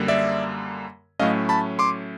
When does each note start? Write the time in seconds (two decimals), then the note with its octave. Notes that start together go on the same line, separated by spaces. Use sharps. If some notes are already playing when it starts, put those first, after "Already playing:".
Already playing: F#2 D3 G3 A#3
0.08 D5 E5
1.19 A2 F#3 A3 C#4 D#5 F5
1.49 A5 B5
1.79 C6 D6